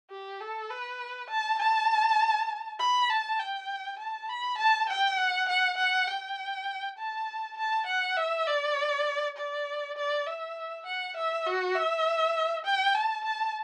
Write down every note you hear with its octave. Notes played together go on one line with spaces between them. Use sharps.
G4
A4
B4
A5
A5
B5
A5
G5
A5
B5
A5
G5
F#5
F#5
F#5
G5
A5
A5
F#5
E5
D5
D5
D5
E5
F#5
E5
F#4
E5
G5
A5
A5